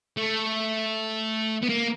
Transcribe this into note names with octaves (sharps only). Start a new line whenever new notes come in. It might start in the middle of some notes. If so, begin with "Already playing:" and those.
A3
B3
A#3